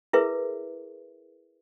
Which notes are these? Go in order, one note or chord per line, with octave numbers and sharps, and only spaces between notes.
E4 G#4 A#4 B4 E5